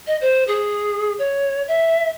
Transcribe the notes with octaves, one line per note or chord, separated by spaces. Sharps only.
D#5
C5
G#4
C#5
E5